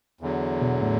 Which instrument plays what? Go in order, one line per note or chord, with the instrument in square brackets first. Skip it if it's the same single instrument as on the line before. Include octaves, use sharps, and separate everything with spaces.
[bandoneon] E2 D3 F#3
[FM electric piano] B2
A2